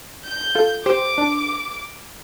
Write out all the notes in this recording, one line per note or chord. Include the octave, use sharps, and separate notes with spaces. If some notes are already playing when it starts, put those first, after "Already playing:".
G6
F4 A4
G4 C5 D6
D4